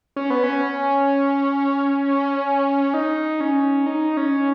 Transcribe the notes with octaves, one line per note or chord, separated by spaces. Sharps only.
C#4
B3
C#4
D#4
C#4
D#4
C#4